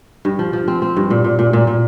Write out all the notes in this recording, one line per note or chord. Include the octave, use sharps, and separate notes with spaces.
G2
F3
F3
C4
C4
G2
A#2
A#2
A#2
A#2
A#2